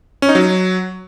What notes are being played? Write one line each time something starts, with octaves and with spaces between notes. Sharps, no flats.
C#4
D#4
F#3